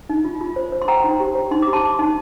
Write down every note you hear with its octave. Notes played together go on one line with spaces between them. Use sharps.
D#4
F4
F4
C5
C5
C6
C5 G5 A#5
D#4
G4
C5
D#4 C6
D6
G4
A5 C6
D#4
D#4